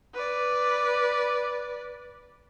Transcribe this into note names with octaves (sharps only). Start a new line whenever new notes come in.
B4 D5